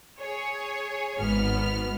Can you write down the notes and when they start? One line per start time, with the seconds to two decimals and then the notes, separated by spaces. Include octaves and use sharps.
0.20 G#4 C#5
1.19 G#1 G#2 B3 F6